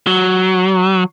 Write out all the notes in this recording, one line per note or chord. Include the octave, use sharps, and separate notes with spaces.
F#3